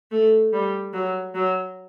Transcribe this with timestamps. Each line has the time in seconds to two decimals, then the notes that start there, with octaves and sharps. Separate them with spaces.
0.11 A3
0.53 G3
0.93 F#3
1.35 F#3